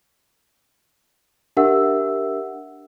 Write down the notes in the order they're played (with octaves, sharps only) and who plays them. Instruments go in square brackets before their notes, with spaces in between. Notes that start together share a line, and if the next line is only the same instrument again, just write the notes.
[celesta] D4 G4 A#4 E5 F#5 E6